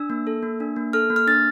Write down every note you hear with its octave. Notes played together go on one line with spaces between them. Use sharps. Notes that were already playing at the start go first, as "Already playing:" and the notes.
Already playing: D4 E6
A#3
A4
A#3
D4
A#3
A4 F6
A#3
F6
D4 A6